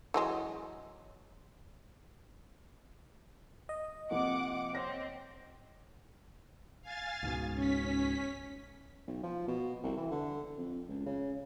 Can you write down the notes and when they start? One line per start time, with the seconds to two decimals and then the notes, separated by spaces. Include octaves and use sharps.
0.14 E3 F#3 G#3
3.69 D#5
4.11 C3 F3 A#3 F#5 D6
4.75 C4 C#5 A#6
6.82 F5 G#5 A6
7.23 C#2 G#2 B2
7.54 C#4 B6
9.07 B1
9.23 F3
9.48 B2
9.83 C2
9.97 E3
10.11 D3
10.58 F2
10.89 C#2
11.06 C#3